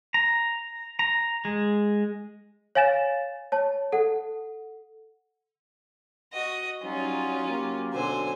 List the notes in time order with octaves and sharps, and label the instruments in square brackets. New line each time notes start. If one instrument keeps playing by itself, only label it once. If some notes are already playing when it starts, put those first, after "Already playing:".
[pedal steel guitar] A#5
A#5
G#3
[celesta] C#5 F5 G#5 A6 E7
C#5 A5
A4 F#5
[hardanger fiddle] F#4 D#5
[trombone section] F#3 G3 D#4 [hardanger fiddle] C#4 F4
[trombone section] F#3 A#3 G4
[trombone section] B2 D3 F#3 [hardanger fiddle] C5 G#5